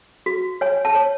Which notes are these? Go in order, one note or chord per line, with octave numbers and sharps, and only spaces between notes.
F#4
C#5 G#5
A5
C#5